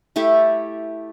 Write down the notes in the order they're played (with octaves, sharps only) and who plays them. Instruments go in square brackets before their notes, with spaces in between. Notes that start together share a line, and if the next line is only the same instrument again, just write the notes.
[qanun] A3 E4 G4 A4